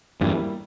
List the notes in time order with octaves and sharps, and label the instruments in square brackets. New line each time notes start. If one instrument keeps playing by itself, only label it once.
[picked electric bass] E2 G2 [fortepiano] G3 A#3 E4